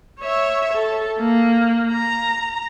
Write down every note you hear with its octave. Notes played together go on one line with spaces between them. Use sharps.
C#5 E5
A4
A#3
A#5